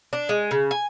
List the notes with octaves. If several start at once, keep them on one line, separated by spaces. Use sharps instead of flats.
D4
G#3
C#3
G#5